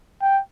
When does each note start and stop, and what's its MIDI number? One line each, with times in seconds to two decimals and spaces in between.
0.22 0.40 79